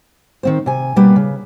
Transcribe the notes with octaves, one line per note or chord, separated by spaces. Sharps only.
D#3 C4 C5
C3 G#5
B2 G3 A#3 D4 B4
C#3